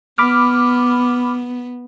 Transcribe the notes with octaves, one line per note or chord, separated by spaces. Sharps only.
B3 B5 D6 F6